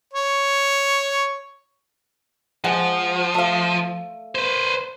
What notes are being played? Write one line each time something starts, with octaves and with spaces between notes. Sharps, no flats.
C#5
F3 G#3 F#5
A3 F5
B4 C5